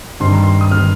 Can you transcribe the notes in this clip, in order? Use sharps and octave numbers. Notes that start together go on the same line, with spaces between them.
G2 D#3 C4 D#4 C6
A#5
C6
D#6
D#3 C4 D#4 F6